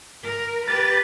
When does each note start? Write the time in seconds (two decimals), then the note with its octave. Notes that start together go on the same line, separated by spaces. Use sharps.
0.23 A#4
0.68 G4 B4 A6